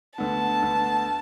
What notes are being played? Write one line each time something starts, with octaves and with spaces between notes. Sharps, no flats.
D2 D3 B3 A5
D2 D3 B3